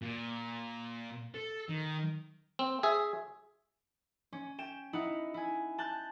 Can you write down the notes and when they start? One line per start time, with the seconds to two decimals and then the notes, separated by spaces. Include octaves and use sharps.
0.02 A#2
1.34 A4
1.69 D#3
2.59 C4
2.83 G#4 E5
4.32 C#4
4.59 G5 E7
4.93 D#4 E4 F#5
5.34 E4 G#5
5.78 A5 F#6 G6